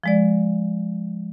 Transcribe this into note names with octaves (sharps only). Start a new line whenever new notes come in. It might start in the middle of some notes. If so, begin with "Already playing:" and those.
F3 G#3 D5